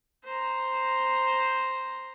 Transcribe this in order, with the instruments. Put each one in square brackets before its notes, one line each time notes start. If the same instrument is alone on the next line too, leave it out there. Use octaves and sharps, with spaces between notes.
[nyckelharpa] C5 A#5